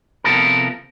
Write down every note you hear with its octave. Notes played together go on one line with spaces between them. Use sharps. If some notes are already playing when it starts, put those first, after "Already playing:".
C3 F3 B3 A4 A#4